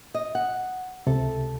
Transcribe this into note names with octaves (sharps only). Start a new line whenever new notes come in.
D#5
F#5
C#2 C3 A4